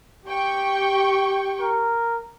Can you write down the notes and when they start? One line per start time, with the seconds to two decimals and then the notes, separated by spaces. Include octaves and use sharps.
0.28 G4 G5 C#6
1.61 A#4